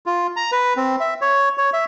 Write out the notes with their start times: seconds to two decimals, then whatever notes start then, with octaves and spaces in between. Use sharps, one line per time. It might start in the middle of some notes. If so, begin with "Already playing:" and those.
0.06 F4
0.36 A#5
0.52 B4
0.77 C4
1.00 E5
1.21 C#5
1.58 C#5
1.73 E5